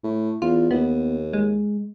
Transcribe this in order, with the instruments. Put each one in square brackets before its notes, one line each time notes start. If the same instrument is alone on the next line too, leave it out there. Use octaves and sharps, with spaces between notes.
[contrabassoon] A2
[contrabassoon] E2 [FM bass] F4
[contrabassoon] D#2 [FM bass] B3
[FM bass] G#3